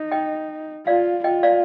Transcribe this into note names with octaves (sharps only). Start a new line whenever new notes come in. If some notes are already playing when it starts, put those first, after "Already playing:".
Already playing: D#4
D#5 G5
F4 D5 F5
F4 D#5 G5
D5 F5